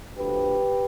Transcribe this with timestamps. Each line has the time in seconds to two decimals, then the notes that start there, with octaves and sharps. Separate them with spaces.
0.17 D2 D3 F3 G4 B4